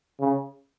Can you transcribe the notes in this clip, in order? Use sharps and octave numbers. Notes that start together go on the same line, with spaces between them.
C#3